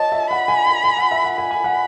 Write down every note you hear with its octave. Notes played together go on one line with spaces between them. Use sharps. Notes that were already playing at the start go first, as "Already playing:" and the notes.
Already playing: C#5 D#5 A5
E5
F#5 B5
G#5
G#5
G#5
F#5
E5
F#5
G#5 B5
G#5
F#5